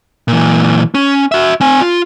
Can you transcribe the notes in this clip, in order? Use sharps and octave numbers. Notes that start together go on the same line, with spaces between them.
A#2 E3
C#4
F#4 E5
C4 G#5
F4